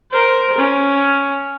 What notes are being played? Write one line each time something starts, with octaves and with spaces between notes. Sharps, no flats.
A#4 C5
C#4